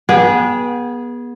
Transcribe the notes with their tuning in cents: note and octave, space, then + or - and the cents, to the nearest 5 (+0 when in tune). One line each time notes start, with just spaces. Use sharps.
B3 -30 G#4 -5 G5 +0